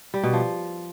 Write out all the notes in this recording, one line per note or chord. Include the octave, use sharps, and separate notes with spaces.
G3
B2
F3